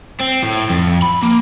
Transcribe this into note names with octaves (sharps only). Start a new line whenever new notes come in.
C4
A2
F2
B5
A#3